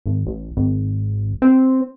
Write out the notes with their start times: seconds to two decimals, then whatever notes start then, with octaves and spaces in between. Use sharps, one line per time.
0.06 G#1
0.27 A1
0.57 G#1
1.42 C4